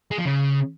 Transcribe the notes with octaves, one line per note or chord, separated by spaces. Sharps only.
G#3
F3
C#3